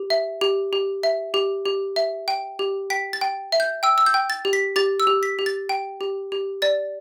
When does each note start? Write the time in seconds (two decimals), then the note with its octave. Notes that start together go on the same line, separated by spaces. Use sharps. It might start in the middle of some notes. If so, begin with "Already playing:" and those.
Already playing: G4
0.10 E5
0.41 G4
0.73 G4
1.03 E5
1.34 G4
1.65 G4
1.96 E5
2.28 G5
2.59 G4
2.90 G5 B6
3.13 A6
3.21 G5
3.52 E5
3.60 G6
3.83 G5 E6
3.98 E6
4.06 G6
4.14 G5
4.30 A6
4.45 G4
4.53 B6
4.76 G4 A6
5.00 E6
5.07 G4
5.23 B6
5.39 G4
5.46 A6
5.69 G5
6.01 G4
6.32 G4
6.62 D5 A6